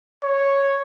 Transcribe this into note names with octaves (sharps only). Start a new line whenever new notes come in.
C#5